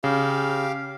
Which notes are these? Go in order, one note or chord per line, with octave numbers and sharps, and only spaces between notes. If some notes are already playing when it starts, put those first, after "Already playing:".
C#3 G4 F5